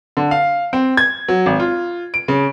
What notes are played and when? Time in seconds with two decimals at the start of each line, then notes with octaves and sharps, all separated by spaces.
0.17 D3
0.31 F5
0.73 C4
0.97 G#6
1.28 F#3
1.46 G#1
1.60 F4
2.14 D7
2.28 C#3